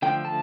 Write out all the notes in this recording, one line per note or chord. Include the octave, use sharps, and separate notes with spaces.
D3 F3 A3 G5
A5